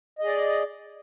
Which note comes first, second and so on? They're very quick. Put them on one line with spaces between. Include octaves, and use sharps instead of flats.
D#5 G#4 D5